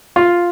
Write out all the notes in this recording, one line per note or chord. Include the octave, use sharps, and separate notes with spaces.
F4